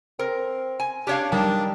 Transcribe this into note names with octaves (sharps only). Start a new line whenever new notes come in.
C4 A#4
G#5
D4 G4 C#5 F5
G3 D4 D#4 A#4